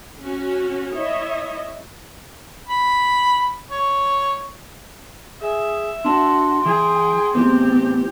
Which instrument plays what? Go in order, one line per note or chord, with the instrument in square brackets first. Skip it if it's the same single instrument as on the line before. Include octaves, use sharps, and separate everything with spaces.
[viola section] C#4 F#4
E4 C#5 D#5 E5
[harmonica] B5
C#5
[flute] G#4 [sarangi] E5
[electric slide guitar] D4 A5 [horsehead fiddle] F#4 [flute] C6
[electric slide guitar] E3 [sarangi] G#4 [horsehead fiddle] G5
[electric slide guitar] A2 E3 B3 [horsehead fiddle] C4 [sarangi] G4